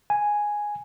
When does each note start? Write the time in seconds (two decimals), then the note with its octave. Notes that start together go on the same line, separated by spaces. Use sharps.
0.10 G#5